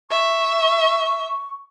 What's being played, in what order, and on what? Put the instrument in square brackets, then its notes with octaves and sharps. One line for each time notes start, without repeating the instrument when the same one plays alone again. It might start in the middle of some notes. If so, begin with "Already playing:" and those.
[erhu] E5 [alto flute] C#6